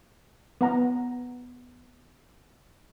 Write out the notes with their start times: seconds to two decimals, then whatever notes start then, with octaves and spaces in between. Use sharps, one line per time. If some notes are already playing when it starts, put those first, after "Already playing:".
0.61 B3 F#5 A#5